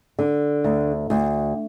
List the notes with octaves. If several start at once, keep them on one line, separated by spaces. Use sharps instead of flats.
D3
D2
D2